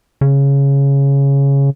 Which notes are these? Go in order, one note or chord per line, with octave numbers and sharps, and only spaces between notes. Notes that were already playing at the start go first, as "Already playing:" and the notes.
C#3